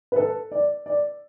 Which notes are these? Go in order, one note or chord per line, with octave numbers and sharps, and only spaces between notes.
B4
A4
D5
D5